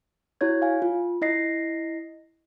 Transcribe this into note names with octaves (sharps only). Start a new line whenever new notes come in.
E4 F#4 C#5 G#6
F5 G#5
F4
E4 D#5 A#6 C7